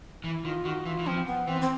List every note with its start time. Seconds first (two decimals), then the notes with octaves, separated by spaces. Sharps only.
0.24 E3 E4
0.45 D#3 F4
0.65 D#3 F#4
0.86 E3 F4
0.99 E3
1.06 F3 C4
1.26 B3
1.48 E3 C4
1.62 C4